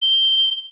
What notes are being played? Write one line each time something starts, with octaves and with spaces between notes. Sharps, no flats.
G7